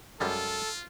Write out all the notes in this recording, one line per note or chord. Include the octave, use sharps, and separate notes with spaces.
F#2 G3 G#3 F4 A4